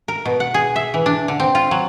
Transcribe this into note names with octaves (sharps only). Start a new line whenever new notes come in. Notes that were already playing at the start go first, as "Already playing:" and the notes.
A#4
B2
F#5
G#4
E5
E3
D4
D3
C4
F4
F#3